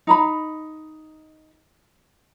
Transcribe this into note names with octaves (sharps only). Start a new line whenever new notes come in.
D#4 A#5 B5